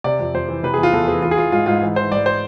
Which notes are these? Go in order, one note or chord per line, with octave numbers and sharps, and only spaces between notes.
C3 D5
F2
F2 C5
E3
C3 B4
E2 G#4
F4
E2 A4
E3 G#4
E3 F4
G#4
E3 F4
G#2 F4
G#2 F4
E3
E3 C5
G#2 D5
C5